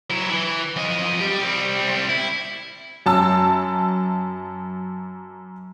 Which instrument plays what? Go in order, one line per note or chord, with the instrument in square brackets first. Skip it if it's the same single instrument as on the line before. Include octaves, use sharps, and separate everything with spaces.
[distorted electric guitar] F#3 E4
E3
F2 D#5
G3 G4
G3 C4
E4
[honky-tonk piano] F#2 A5 E6